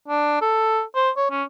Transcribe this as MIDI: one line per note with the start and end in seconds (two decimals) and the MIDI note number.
0.08 0.40 62
0.42 0.82 69
0.95 1.10 72
1.17 1.30 73
1.31 1.44 61